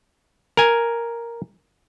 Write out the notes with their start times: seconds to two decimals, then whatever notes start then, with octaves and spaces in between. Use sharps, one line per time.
0.57 A#4 G#5